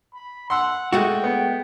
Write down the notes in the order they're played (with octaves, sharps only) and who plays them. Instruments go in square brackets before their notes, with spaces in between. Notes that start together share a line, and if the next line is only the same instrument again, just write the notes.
[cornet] B5
[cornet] F#5 [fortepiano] C6 E6
[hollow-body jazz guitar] G#3 A3 F#4 [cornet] G5
[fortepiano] B3